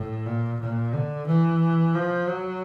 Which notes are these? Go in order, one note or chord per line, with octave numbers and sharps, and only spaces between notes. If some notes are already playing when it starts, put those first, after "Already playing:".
Already playing: A2
A#2
A#2
D3
E3
F3
F#3